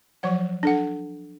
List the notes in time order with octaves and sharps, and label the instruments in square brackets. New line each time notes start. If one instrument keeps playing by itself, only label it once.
[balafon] F3 F#3 C#5 F#5
D4 A4 F#5